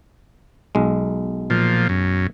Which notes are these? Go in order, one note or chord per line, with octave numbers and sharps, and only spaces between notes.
B1 G#3
A#2 F3
F#2